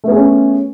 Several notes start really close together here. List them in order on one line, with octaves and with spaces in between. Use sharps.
A3 B3 G#4 C#4